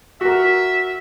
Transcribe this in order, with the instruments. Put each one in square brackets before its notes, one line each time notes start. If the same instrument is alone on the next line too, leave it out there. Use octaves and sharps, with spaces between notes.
[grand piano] F#4 A#4 [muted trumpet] E5